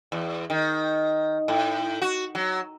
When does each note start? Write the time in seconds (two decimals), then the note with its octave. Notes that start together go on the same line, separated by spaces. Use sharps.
0.12 E2
0.50 D#3
1.48 A2
2.02 F#4
2.35 F#3